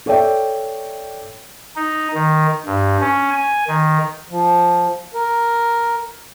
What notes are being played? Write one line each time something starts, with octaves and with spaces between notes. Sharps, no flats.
A4 C#5 D5 E5 G5
D#4
D#3
G2
C#4
G#5
D#3
F3
A#4